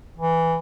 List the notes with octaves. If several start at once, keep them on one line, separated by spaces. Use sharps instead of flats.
E3